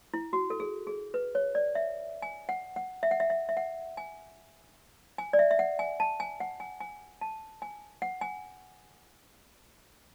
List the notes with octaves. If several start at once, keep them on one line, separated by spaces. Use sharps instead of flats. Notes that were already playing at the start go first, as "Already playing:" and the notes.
E4
F#4
A4
G#4
G#4
B4
C#5
D5
E5
G#5
F#5
F#5
E5
F#5
E5
E5
E5
F#5
G#5
G#5
D5
E5
E5
F#5
G#5
A5
G#5
F#5
G#5
G#5
A5
G#5
F#5
G#5